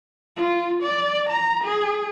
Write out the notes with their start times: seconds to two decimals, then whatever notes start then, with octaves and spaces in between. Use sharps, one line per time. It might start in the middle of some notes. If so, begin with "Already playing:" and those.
0.37 F4
0.83 D5
1.29 A#5
1.64 G#4